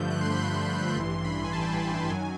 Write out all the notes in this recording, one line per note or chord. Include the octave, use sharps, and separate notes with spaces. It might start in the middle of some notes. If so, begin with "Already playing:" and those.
Already playing: G2 D3 F3 A3 G6
F#6
C6
B5
C6
C6
A1 G2 E3
B5
G#5
A5
G5
G5
G#5
A5
F#2 D#3 F#3 G#5